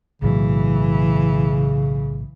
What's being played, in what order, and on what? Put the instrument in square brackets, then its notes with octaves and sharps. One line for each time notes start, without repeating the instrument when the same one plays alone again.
[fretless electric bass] B1 A2 F#3 [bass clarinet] C#3 [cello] E3